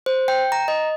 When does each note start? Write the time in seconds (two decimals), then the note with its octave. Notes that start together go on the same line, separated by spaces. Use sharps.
0.06 C5
0.28 G5
0.52 A#5
0.68 D#5